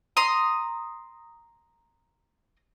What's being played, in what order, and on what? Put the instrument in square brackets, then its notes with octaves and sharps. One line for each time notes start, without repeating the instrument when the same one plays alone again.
[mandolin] A#5 C6 D#6